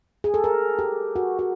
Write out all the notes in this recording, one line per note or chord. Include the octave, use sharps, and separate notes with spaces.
G#4
A4
A#4
G4
F#4
F#4